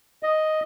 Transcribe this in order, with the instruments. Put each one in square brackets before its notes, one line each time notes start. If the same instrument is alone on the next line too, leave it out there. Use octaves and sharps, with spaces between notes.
[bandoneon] D#5